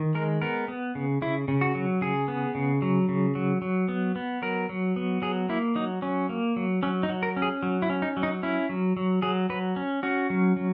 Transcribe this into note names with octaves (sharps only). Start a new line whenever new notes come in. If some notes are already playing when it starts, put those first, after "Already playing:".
Already playing: D#3
G#3 A#4
B3 A#4
B3
C#3
C#3 E4
C#3
F#4
F#3
C#3 G#4
B3
C#3
F#3
C#3
F#3
F#3
B3
B3
F#3 A#4
F#3
B3
F#3 G#4
A#3 E4
F#3 D#4
F#3 C#4
A#3
F#3
F#3 C#4
D#4
F#3
A#4
C#4
G#4
F#3
E4
C#4
D#4
F#3
D#4
C#4 E4
F#3
F#3
F#3 G#4
F#3 B4
C#4
C#4 F#4
F#3
F#3